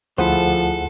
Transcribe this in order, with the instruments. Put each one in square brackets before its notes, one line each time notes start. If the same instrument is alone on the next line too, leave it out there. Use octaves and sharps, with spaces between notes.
[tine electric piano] D2 F#5 [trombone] F3 [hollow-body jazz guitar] E4 G#4 C5 [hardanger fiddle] A4